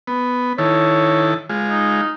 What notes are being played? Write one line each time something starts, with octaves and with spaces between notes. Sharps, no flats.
B3
D#3 E4 A4 C#5
G#3 F4
D#4